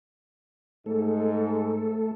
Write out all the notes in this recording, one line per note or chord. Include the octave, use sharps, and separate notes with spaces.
G#2 A3 A4